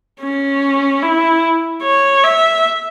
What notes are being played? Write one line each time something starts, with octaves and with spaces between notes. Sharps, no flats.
C#4
E4
C#5
E5